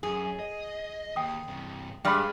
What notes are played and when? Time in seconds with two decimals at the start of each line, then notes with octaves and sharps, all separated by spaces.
0.03 F#2 G#4
0.39 D#5
1.16 D#2 G5 D#6
1.48 G2 C3
2.05 G2 G3 G#3 D5 G5 B5 F6